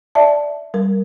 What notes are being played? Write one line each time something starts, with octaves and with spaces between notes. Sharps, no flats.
D5 E5 A5
G3 A#4